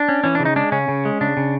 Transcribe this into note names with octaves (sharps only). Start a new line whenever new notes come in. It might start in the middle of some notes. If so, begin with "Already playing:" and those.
Already playing: D4
C#4
E3 C#4
C#3 D4
D#4
G#3 D4
C#3 C#4
C#3
G#3
C#3 D4
C#3